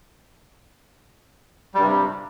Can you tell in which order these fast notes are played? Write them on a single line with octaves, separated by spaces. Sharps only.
G3 G2 C3